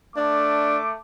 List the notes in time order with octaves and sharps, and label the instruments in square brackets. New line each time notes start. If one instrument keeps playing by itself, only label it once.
[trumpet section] A3 D6 [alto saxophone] D4